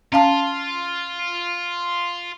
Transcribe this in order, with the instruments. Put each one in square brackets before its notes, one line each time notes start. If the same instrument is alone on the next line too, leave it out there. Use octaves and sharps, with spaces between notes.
[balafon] C#4 F5 A5 [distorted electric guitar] F4